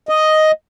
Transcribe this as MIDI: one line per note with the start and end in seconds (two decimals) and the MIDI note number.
0.09 0.51 75